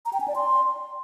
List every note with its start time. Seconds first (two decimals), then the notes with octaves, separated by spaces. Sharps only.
0.06 A#5
0.13 G5
0.20 G#5
0.28 D5
0.35 C6